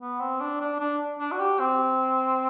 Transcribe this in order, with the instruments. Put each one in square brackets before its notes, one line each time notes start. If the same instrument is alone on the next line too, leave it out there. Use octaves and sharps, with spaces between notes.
[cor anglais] B3
C4
D4
D4
D4
D4
F#4
G4
C4